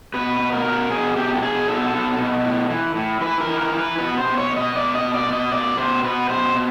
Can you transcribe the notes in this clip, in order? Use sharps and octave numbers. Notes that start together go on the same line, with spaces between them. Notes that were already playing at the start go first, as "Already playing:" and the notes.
B2 B4
B2
A#4
B2
B2 G#4
B2 G4
A4
B2 G#4
B2 A4
B2
B2
A2
E3
A2
E3 B4
A#4
E3
A#4
E3
B4
B2 B4
C5
B2
C#5
B2
D#5
B2 D5
D#5
B2
D5
B2
D#5
B2 D5
B2 C5
B2 B4
B2 C5
B2